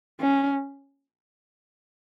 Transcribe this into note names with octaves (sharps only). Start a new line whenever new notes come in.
C#4